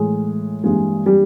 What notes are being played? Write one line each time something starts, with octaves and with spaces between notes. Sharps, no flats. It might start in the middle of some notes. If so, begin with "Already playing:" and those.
Already playing: A2 E3 G#3 G#4
G2 E3 G3 G#3 A#3 G#4
G3 G4